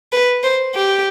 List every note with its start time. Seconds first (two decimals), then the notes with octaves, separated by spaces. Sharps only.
0.12 B4
0.43 C5
0.75 G4